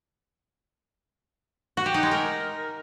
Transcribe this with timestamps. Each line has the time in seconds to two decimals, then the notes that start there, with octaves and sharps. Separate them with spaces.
1.77 F#4
1.86 G4
1.94 D#4
2.03 G#3
2.11 A#4